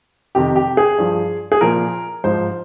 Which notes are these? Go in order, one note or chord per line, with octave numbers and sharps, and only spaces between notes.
F2 C3 D#3 G4
G4
G#4
G2 F3
G#4
A#2 F3 A#4
G#2 F3 C5